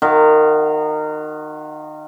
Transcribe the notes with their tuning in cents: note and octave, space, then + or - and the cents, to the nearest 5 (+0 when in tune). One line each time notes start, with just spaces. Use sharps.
D#3 -25 F#4 +0 F5 -15